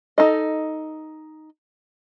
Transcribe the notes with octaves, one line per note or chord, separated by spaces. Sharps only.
D#4 A4 D#5